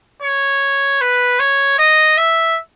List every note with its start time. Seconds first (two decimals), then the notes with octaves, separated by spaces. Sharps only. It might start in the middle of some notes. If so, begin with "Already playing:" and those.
0.23 C#5
1.01 B4
1.40 C#5
1.79 D#5
2.17 E5